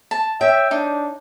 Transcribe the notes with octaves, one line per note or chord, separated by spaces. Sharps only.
A5
C#5 E5 G5
D4 D#4